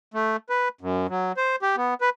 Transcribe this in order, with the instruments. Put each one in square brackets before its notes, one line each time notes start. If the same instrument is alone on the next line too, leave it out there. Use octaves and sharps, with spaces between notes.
[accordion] A3
B4
F#2
F#3
C5
G4
B3
B4